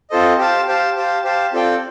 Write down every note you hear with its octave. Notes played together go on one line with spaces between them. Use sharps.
C4 F4 A4 C5 D#5
G4 C5 F5 A5
G4 C5 F5 A5
G4 C5 F5 A5
G4 C5 F5 A5
C4 F4 A4 D5 G5